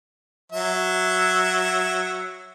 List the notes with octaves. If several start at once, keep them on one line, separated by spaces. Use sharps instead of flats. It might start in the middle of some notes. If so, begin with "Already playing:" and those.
F#3 E5